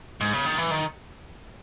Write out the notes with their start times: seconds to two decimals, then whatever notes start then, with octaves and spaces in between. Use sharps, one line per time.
0.21 G#2
0.33 C#3
0.45 D#3
0.58 E3
0.71 D#3